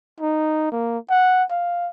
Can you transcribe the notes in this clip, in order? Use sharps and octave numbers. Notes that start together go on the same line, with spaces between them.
D#4
A#3
F#5
F5